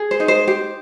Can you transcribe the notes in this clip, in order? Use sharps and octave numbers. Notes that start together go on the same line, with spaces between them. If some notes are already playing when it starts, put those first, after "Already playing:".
Already playing: G#4
C5
D#4
C5
G4 C5